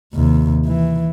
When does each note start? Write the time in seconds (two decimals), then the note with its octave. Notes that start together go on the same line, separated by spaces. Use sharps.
0.14 D#2 C3
0.65 E3